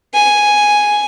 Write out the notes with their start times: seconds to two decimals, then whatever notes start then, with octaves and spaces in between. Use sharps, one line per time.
0.14 G#5